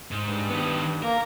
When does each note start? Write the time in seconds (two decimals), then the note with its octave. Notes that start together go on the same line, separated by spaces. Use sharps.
0.11 G#2
0.26 G2
0.50 D#3 B3
1.02 A#3 A#4